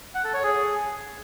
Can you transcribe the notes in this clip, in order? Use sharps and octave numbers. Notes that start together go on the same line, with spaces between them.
F#5
A4
C#5
G#4